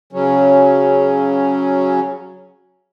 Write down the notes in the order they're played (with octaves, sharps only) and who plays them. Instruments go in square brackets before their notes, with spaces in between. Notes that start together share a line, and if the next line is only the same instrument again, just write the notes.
[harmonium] C#3 F#3 C#4